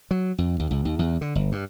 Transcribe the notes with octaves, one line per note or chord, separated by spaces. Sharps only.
F#3
F2
D#2
C#2
D#2
E2
D3
G1
G2